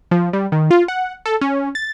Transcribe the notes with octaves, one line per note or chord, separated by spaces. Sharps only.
F3
G3
D#3
F4
F#5
A4
C#4
A6